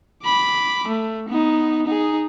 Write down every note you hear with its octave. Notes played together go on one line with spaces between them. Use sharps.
B5 D6
A3
B3 D#4
D#4 G#4